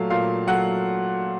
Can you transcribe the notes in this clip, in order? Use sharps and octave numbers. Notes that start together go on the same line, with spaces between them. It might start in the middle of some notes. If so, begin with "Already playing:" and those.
Already playing: A#2 F#3 A3 F5
A#2 F5
F#3 A3 F#5